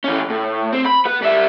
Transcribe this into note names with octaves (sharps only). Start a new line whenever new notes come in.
E3 C#4
A2
C4
B5
B3 B4
G3 E5